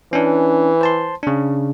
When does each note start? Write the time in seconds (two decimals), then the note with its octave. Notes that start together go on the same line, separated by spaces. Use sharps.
0.13 E3 C#4 D4
0.81 C5 A5 C6
1.23 C#3 D4